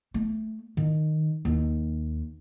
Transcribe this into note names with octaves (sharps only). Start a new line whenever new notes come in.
A3
D#3
D#2